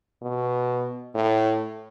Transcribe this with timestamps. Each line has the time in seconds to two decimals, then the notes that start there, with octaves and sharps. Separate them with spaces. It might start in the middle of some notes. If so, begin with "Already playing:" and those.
0.22 B2
1.14 A2